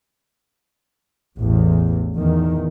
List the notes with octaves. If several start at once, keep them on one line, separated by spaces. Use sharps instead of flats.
A1 E2
E2 D#3